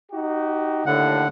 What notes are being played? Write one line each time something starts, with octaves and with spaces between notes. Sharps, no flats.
D#4 F#4 G4
D#2 A2 D3 F#5